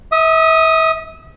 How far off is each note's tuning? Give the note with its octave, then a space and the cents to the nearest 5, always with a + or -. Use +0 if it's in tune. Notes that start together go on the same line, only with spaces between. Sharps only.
E5 -35 D#6 +0